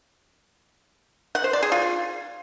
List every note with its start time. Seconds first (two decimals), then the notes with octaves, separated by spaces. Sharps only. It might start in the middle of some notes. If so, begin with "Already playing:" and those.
1.35 F#5
1.44 C5
1.53 D5
1.63 G#4
1.72 F4